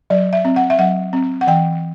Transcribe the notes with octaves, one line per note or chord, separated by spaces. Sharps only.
F#3 D5
E5
C4
F#5
E5
F#3 F#5
C4
F#5
E3 G5